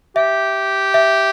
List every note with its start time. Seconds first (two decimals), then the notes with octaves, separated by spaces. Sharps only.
0.16 G4 E5
0.94 E5